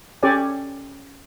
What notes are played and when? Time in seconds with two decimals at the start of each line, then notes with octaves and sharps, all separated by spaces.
0.23 C#4 G4 A4 C#5 D5 G#5